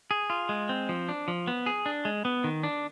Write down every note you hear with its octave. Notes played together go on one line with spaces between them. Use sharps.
G#4
F4
G#3
C4
F3
D4
F3
B3
G#4
D4
G#3
B3
D#3
D4